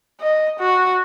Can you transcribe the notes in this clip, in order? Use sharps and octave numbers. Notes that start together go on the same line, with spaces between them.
D#5
F#4